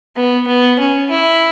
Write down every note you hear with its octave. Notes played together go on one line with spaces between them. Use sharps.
B3
B3
C#4
E4